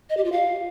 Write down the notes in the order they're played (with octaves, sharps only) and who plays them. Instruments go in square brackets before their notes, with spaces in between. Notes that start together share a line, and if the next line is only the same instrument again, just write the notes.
[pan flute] D#5
G4
F4
F5